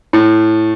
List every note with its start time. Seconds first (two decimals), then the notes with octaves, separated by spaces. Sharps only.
0.13 A2